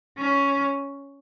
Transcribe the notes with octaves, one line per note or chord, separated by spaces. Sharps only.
C#4